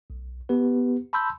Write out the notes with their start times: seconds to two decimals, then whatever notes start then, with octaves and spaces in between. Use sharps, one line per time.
0.10 B1
0.49 B3 G4 B4
1.13 A5 B5 C6 E6 G6